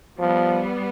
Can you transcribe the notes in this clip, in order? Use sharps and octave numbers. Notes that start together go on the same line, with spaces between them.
F3 G3 B3